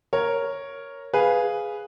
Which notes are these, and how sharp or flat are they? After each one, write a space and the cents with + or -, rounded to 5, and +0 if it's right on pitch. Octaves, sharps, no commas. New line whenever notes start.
A#4 +0 C#5 +0
G#4 +0 B4 +0 F5 +0